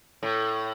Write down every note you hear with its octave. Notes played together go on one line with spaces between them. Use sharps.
A2